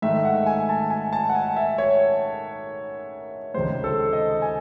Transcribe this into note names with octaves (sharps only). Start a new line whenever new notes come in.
G#2 D#3 A3 E5
F#5
G#5
A5
G#5
A5
F#5
G#5
E5
C#5
C#2 C3 D#3 G#3 C5
A4
D#5
G#5